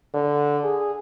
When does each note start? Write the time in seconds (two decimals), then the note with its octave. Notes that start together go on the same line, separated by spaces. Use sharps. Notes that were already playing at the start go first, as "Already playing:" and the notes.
0.14 D3
0.64 G#4